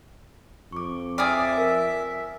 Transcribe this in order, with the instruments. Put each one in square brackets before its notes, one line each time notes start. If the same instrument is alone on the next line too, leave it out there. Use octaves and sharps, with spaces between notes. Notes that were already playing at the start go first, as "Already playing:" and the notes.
[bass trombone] F2 [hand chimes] C#6 D6
[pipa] G#4 D5 [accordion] E5 [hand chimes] G5 F6
[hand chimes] A#4 G#5